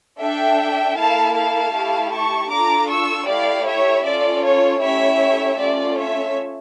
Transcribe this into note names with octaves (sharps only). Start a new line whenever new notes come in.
D4 A4 E5 G5
A#3 E4 A4 F5 A5
F5 A5
A3 E4 G4
A5 C#6
D4 F4 A4 A#5 D6
C#6 E6
A3 E4 G4 D5 F5
C#5 E5
C#4 F4 A4 D5
C#5
A3 C#4 E4 G4 C#5 E5
A3 C#4 F4 D5
C#5 E5